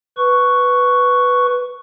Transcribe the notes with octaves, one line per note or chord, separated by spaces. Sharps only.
B4 C#6